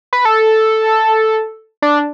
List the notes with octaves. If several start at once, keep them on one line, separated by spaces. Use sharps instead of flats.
B4
A4
D4